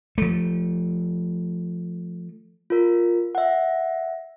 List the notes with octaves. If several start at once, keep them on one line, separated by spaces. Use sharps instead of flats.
F3 A3
F4 A#4
E5 F#5